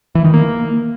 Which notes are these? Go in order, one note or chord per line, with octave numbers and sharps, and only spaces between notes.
E3
D#3
A#3